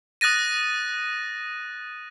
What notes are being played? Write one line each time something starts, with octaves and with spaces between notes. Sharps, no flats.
D#6 F#6 A6 A#6 D#7